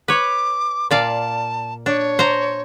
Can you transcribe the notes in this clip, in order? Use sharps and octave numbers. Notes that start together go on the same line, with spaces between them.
B4 C#5 D6
A#2 D5 F5 A5
D4 C#5
C5 A#5